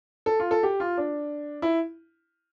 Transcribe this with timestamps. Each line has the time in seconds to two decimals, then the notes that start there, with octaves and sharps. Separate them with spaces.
0.26 A4
0.40 F4
0.51 A4
0.63 G4
0.80 F4
0.97 D4
1.62 E4